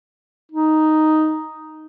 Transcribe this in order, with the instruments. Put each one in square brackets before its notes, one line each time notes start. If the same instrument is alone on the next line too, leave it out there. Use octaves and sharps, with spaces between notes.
[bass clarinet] D#4